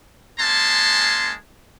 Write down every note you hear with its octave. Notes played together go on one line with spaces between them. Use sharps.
G#3 A#3 C#4 G#5 A5 C6